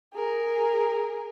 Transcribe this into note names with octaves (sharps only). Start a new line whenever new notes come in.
G#4 A#4